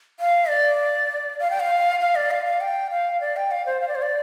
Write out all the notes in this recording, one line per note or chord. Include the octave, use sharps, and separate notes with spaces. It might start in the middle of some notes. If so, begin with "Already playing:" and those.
F5
D5
F5
G5
F5
F5
D5
F5
F5
G5
F5
D5
G5
F5
C5
F5
D5
C5
D5